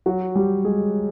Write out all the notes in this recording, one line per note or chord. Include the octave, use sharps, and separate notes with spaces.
F#3 F#4
G3 G4
G#3 G#4